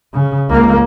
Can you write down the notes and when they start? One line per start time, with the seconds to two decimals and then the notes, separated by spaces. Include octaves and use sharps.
0.13 C#3
0.50 C#2 A#3